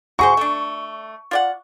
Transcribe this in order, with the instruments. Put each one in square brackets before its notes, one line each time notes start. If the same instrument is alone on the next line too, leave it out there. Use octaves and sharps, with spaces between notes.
[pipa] F#4 G#4 C5 [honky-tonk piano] C#6
[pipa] A3 D4
F4 D5 F#5